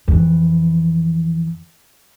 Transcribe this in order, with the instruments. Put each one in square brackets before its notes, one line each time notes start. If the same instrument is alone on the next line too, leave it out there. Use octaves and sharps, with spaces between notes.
[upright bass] F2 E3